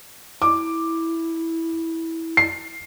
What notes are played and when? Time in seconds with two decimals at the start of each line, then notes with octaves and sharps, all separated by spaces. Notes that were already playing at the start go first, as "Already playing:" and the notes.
0.42 E4 D6
2.37 C7